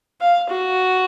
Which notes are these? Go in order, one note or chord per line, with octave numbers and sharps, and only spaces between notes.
F5
F#4